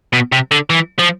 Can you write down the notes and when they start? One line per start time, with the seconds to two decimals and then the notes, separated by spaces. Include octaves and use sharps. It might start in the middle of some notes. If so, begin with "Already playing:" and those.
0.13 B2
0.32 C3
0.51 D3
0.70 E3
0.99 F3